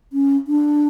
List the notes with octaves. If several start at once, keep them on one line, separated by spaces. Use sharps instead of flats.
C#4
D4